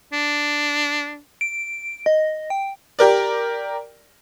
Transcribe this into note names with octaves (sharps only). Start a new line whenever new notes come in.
D4
D7
D#5
G5
G4 A#4 D5